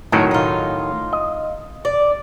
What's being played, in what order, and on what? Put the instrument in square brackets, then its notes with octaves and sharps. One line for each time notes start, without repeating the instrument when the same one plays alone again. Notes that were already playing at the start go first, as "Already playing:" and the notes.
[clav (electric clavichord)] A2 D#3 F#3 [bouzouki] A#3 C#4
[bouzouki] D#4 F4
[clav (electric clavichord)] D#5
[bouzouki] D5